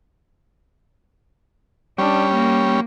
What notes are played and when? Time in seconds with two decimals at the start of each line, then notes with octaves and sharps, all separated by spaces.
1.98 G3 C#4 D4
2.33 A#3